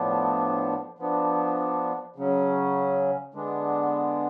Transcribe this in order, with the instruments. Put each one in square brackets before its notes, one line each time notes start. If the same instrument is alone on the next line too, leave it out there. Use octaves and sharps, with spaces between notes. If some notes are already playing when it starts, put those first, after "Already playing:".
Already playing: [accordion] A2 F3 B3 D4
F3 B3 D4
C#3 F#3 C#4
D3 G#3 B3 D4